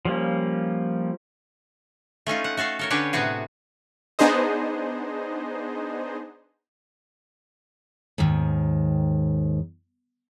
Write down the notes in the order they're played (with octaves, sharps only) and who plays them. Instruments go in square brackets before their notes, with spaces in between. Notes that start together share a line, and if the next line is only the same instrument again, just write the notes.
[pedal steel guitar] F3 G3 A#3 C#4
[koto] A3 C#4 D#4 F4
F#5
A3 F#4 A4 F5
A4 A#4 C#5
D3 C#4 D4 G4 B4 C#5
A2 C3 B3 F#4 G#4
[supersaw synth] B3 D4 D#4 G#4 C5 D#5
[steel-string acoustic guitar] D#2 G#2 D#3